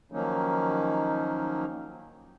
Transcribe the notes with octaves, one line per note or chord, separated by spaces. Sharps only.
D#3 F3 F#3 A#3 C#4 D#4